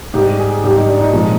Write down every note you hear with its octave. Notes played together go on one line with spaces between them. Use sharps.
G#2 G3 G4
G#4
G#2 G3 G4
D#4
D4
D#4
A#2 F3 G#3